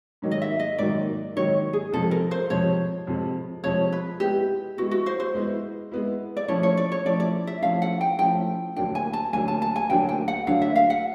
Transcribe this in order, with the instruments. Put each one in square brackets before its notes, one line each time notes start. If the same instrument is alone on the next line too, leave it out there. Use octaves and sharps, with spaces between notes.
[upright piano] G#2 D#3 F#3 A#3 D#4
[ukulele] D#5
E5
D#5
[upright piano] G#2 D#3 F#3 A#3 D#4 [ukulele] D5
[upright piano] G#2 D#3 F#3 A#3 D#4 [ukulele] C#5
[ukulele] G#4
[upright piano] F2 C3 F3 G#3 [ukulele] A4
[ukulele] A#4
C5
[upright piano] F2 C3 F3 G#3 [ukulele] C#5
[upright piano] F2 C3 F3 G#3
[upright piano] F2 C3 F3 G#3 [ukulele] C#5
[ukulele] B4
[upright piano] G#3 B3 E4 [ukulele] G4
[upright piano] G#3 B3 E4 [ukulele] F#4
[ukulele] F#4
C5
C5
[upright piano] G#3 B3 E4
G#3 B3 E4
[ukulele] D5
[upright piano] F3 A3 C#4 E4 [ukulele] C#5
[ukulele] C#5
D5
C#5
[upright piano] F3 A3 C#4 E4 [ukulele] D5
[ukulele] D5
E5
[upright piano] F3 A3 C#4 E4 [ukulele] F5
[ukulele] F#5
G5
[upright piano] F3 A3 C#4 E4 [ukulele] G5
[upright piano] D2 D3 F#3 A#3 D4 [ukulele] G5
[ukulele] G#5
A5
[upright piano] D2 D3 F#3 A#3 D4 [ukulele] G#5
[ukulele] A5
A5
G#5
[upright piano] D2 D3 F#3 A#3 D4 [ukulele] G5
[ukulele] G5
F#5
[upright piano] D2 D3 F#3 A#3 D4 [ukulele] F5
[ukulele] E5
F5
F#5